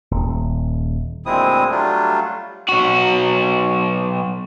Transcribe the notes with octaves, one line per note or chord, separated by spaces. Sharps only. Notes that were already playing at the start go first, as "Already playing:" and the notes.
D#1
D2 A#2 G#3 C4 E4 D#6
F#3 G3 A3 D4 F4
B1 F#4